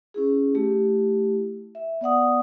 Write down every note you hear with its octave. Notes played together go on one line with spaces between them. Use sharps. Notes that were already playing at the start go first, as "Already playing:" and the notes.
C#4 E4 G#4
A3 E4 G4
E5
B3 D5 F#5 D#6